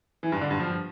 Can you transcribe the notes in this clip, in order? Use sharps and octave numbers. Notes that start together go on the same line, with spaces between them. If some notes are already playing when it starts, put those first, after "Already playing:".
E3
G2
D3
G2
F3